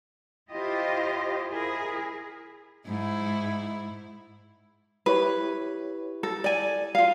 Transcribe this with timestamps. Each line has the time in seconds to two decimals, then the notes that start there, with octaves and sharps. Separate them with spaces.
0.51 E4 F4 G4 C5 D#5
1.50 E4 G#4 A#4
2.87 G#2 E4
5.06 E4 G4 B4 C#5
6.23 A4
6.44 D5 G#5
6.95 F4 F5